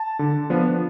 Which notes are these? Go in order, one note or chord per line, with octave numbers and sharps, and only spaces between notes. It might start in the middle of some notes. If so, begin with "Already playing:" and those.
Already playing: A5
D3
F3 B3 D4